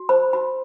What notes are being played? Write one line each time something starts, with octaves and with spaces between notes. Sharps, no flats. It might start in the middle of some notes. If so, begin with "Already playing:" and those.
Already playing: F#4
C5 B5
F#4 B5